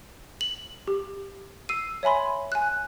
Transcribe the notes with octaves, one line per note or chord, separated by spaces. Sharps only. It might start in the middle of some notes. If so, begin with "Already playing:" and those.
F#7
G4
E6 C7 D#7
C#5 E5 G#5 B5 C6
G#5 F#6